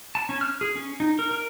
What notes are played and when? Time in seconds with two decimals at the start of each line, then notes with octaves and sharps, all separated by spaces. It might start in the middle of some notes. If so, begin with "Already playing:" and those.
0.15 A5
0.29 C#4
0.41 F6
0.61 G#4
0.76 C#4
1.00 D#4
1.19 A#4
1.31 A#4